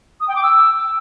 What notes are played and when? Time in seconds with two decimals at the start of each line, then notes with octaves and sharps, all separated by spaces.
0.20 D#6
0.28 G5
0.35 D6
0.43 E6